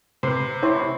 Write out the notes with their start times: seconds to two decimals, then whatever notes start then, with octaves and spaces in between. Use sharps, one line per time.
0.23 C3 B4 C6
0.63 E4 C5 C#5